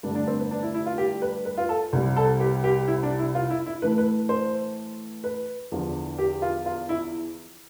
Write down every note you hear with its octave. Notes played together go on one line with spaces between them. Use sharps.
G2 D3 A3 D4
D4
C4
B3
D4
E4
E4
F4
G4
B4
B4
F4
A4
C2 C3 G3
A4
G4
G4
E4
D4
E4
F4
E4
E4
A2 E3 A3 B4
B4
C5
B4
E2 D3 F3
G4
F4
F4
E4